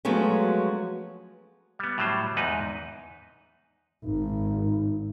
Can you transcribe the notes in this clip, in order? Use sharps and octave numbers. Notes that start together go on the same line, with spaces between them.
F3 F#3 G#3 A3 B3 C#4
G3 B3
A2 F#3 G3 C5
E2 G#2 D#4 B4
G#1 D#4